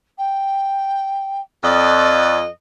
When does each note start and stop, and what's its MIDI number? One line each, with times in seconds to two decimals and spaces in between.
0.18 1.41 79
1.64 2.47 41
1.64 2.38 74
1.64 2.47 75